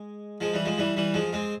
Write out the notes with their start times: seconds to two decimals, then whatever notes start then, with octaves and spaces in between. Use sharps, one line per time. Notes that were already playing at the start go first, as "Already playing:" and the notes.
Already playing: G#3
0.41 F3 G#3
0.54 E3 G3
0.65 F3 G#3
0.78 E3 G3
0.96 E3 G3
1.14 F3 G#3
1.33 G#3 C4